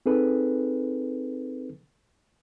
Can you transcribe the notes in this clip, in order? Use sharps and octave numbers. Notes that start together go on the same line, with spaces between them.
C4 D#4 G#4 A4 B4